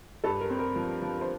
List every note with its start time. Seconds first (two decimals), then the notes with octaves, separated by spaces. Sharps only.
0.24 G2 A4
0.41 A#4
0.50 C4
0.59 A#4
0.76 F3
1.02 F3
1.21 C5